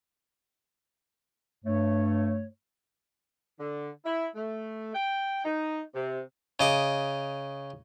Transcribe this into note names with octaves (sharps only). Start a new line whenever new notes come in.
G2 A3 C#5
D3
E4
A3
G5
D#4
C3
C#3 D#5 D6